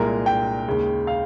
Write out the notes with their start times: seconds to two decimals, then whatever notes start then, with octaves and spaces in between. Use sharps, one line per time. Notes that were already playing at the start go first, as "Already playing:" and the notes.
Already playing: C2 A#2 G#3 A#4
0.26 G5
0.67 D#2 C#3 G#3
1.07 F5